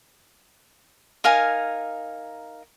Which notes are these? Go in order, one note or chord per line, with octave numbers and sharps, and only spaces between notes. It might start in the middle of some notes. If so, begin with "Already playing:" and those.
D#4 A#4 F5 G#5